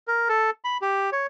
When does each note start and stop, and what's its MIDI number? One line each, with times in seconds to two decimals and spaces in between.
0.08 0.28 70
0.29 0.50 69
0.64 0.78 83
0.82 1.10 67
1.12 1.27 73